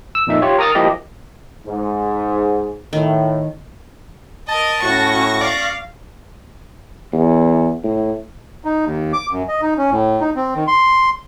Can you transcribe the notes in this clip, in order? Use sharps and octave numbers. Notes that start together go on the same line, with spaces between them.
E6
F2 A#2 D#4 E5
F4 G4 C#5
A#4 A#5 D#6 F6 A6
F3 A#3 E4 G4 D#5
G#2
A2 D#3
A#4 D#5 A5
A2 C#4 F#4 C#6 A#6
D5 F5
E2
A2
D#4
D#2
D6
F#2
D#5
D#4
C#4
A2
D#4
C4
D#3
C6